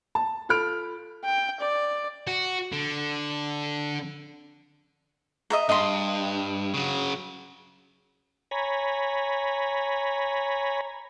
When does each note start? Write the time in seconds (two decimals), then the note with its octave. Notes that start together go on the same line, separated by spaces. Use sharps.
0.15 A5
0.49 F4 A4 B5 F6 D7
1.25 G5
1.61 D5
2.28 F#4
2.72 D3
5.50 D#5 E5 A#5
5.69 G2 D#5 C6
6.74 C#3 F#3
8.51 C#5 G#5 A#5 B5